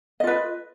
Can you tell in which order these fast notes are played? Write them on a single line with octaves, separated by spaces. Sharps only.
D#5 F4 B4